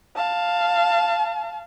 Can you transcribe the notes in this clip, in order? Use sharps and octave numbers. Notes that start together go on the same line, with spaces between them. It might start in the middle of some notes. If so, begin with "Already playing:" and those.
F5 A5